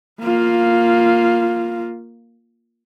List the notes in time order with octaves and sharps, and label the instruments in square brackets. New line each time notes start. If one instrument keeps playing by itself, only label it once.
[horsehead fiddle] A#3 F4